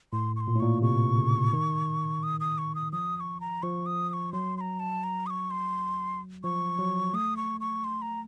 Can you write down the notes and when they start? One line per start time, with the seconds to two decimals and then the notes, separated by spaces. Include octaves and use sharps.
0.13 A2 C6
0.36 C#6
0.40 C6
0.48 A#2
0.55 A2
0.60 A#2 C#6
0.82 C3 C#6
1.17 C#3
1.53 D#3
2.23 D#6
2.40 D#6
2.58 C#6
2.75 D#6
2.93 F3 D#6
3.17 D#6
3.20 C#6
3.41 A#5
3.63 F3 C#6
3.86 D#6
4.09 D#6
4.13 C#6
4.33 F#3 C6
4.57 C6
4.61 A#5
4.80 A5
5.04 A#5
5.26 D#6
5.30 C#6
5.51 C6
6.44 F3 C#6
6.79 F#3
7.13 A3 D#6
7.37 C#6
7.61 C#6
7.84 C6
8.02 A#5